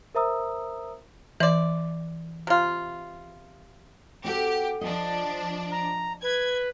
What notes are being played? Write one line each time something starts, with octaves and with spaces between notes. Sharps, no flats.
A#4 C5 E5 A#5 D#6 E6
E3 C5 D5
C3 F4
C4 F#4 G4 A4
F3 D4 D#5
A#5
B4 G#6